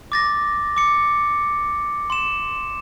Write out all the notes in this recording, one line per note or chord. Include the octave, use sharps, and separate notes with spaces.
D6 A6 A#6
D6 C#7
C6 E7